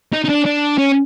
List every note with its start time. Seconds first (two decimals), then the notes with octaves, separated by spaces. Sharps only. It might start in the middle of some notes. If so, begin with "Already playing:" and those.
0.13 D#4
0.25 D#4
0.29 D4
0.46 D4
0.78 C#4